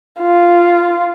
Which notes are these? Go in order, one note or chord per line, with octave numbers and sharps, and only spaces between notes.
F4